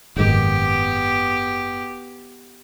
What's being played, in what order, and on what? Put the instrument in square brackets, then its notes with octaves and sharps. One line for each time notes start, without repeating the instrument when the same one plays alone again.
[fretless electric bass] F#1 G#2 D#3 [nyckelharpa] B3 G4